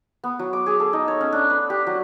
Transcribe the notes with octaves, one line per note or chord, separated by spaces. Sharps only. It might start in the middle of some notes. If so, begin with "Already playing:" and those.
B3
F#3
D6
G#4
A4
D#4
C#5
C#4
D4
B4
G4
F#3